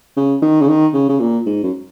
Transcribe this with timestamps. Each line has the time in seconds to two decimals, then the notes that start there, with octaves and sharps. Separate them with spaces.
0.17 C#3
0.42 D#3
0.61 C#3
0.69 D#3
0.93 C#3
1.09 C#3
1.20 A#2
1.46 G#2
1.63 F#2